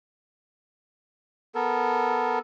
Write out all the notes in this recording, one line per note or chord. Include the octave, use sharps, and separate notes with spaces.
B3 A4 A#4